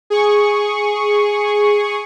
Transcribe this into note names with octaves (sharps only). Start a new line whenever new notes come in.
G#4 C#6